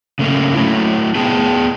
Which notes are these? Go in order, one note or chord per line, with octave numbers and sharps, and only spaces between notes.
C#3 A3 A#3 C#4
F#3 A3 E4
B3 G#4 G5 A5